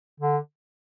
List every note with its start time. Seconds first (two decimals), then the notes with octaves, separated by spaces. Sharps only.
0.20 D3